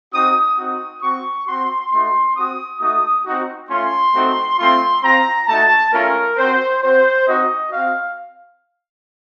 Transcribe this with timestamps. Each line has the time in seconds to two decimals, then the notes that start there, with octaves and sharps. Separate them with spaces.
0.13 C4 D#4 F#4 D#6
0.58 C4 D#4 F#4 D#6
1.02 C4 F#4 C#6
1.47 C4 F#4 C6
1.91 A3 D#4 F#4 C6
2.36 C4 F#4 D#6
2.80 A3 D#4 F#4 D#6
3.26 C4 D#4 F#4
3.69 A3 C#4 F4 C6
4.15 A3 C4 D#4 F#4
4.59 A3 C4 F4 C6
5.03 C4 F4 A#5
5.48 A3 D#4 F#4 A5
5.93 A3 C#4 F4 A#4
6.37 C4 F#4 C5
6.82 C4 F#4 C5
7.27 C4 D#4 F#4 D#5
7.71 C4 F#4 F5